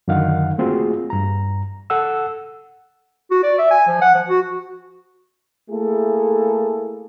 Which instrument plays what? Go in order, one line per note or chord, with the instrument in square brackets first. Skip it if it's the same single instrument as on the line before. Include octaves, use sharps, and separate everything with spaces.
[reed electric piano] F#2 D3 D#3 F5 F#5
A3 A#3 C4 F4 F#4 G#4
G2 A#5
A4 F#5 E6
[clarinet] F#4
D5
E5
G#5
F3
F#5
F3
F#4
[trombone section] A3 A#3 E4 G#4 A4